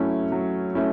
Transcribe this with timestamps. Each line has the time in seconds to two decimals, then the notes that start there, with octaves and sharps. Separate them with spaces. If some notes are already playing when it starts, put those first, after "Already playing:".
Already playing: F#3 A3 C#4 E4
0.32 F#3
0.75 A3 C#4 E4